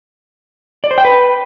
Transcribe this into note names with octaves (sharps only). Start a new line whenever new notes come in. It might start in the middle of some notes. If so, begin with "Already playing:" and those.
D5
C5
G5
B4